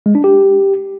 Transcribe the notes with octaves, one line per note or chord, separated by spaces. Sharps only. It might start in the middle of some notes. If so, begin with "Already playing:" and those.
G#3
D4
G4